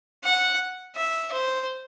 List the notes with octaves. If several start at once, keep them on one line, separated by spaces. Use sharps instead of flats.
F#5
E5
C5